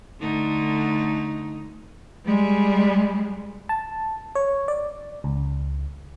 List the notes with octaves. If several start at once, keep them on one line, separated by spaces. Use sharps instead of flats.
D3 A3 D#4
G3 G#3
A5
C#5
D5
C#2